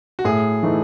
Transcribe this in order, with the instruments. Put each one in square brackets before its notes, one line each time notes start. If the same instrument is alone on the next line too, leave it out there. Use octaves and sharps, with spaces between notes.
[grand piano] F#4
[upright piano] A2 [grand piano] G#4
[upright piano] E3 A3 D#4